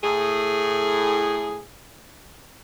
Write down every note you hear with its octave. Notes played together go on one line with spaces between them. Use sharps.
A2 G#4